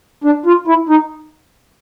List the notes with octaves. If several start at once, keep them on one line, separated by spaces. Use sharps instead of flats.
D4
F4
E4
D#4